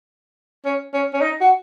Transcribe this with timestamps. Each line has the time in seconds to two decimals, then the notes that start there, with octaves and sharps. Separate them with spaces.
0.65 C#4
0.94 C#4
1.14 C#4
1.22 D#4
1.41 F#4